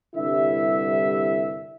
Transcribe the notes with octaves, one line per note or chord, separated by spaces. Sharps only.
C2 G2 D3 E4 E5